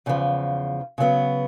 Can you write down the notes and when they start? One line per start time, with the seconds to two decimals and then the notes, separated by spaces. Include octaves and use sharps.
0.06 E2 C#3 F3
0.98 C#3 F#3 B3